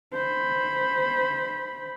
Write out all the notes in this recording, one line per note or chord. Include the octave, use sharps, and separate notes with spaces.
C5 B5